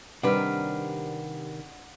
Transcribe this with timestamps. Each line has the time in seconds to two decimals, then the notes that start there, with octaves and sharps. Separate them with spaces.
0.23 C3 D#3 G3 D4 A#4 B4 F#5 F6